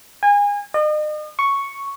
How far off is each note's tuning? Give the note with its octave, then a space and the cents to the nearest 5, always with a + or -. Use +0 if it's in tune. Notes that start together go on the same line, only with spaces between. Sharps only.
G#5 -30
D#5 -40
C#6 +0